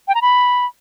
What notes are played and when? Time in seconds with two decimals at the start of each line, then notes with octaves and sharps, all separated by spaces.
0.08 G5
0.15 A#5
0.22 B5